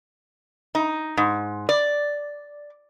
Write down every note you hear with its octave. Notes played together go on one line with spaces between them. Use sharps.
D#4
G#2
D5